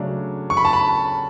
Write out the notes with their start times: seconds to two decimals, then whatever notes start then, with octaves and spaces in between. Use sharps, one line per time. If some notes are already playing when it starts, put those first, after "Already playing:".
Already playing: C#3 F#3 A3 D4
0.50 C#6
0.57 B5
0.65 A5
0.73 B5